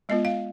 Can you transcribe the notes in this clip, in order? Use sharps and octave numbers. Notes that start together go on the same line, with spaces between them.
G#3 B3 F4 D#5
F5